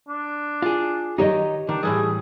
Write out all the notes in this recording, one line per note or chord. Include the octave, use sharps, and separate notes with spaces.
D4
F4 G#4
D#3 D#4 G4 C#5 D#5
D#3 D4
A2 E3 G3 G#4